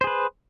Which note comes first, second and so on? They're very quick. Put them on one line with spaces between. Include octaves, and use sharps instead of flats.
C5 G#4 B4